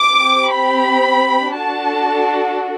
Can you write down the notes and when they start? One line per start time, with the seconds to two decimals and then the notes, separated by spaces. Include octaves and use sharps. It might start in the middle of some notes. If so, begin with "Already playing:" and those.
Already playing: D6
0.16 C4 G4
0.52 B5
1.57 D4 F#4 A4 A5